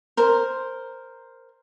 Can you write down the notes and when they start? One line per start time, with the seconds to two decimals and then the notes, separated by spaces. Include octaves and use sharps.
0.17 A#4 C5